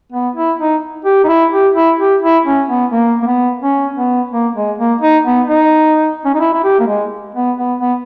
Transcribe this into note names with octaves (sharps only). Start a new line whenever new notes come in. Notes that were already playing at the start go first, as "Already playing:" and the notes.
B3
E4
D#4
G4
D#4
E4
G4
E4
G4
E4
C#4
B3
A#3
A#3
B3
C#4
B3
A#3
G#3
A#3
D#4
B3
D#4
C#4
D#4
E4
E4
G4
A#3
G#3
B3
B3
B3